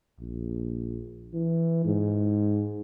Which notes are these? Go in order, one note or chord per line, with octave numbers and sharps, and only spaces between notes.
A#1
E3
G#2